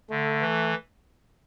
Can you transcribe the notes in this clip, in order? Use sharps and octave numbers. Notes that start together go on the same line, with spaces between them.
D3 A3
E3